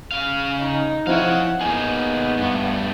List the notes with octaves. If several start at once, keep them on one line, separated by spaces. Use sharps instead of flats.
C#3 F5
D#4
F3 C4 E4 C#5 F5 F#5
A#3 B3 D#4 G#4 G#5
G2 A3